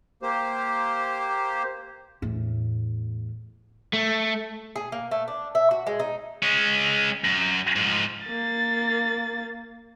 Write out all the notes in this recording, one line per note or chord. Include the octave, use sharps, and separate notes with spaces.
A#3 G4 C5
E2 A2
A3
G#4
A#3
A3
D4
E5
F#4
G#3
D#4
G#3 C#4
F#2
G#2 F3
A#3 A6